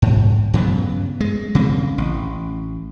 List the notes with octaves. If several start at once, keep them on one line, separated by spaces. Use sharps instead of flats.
G#2
G2 C#3 F#3 B3
G#3
C#3 C4
A1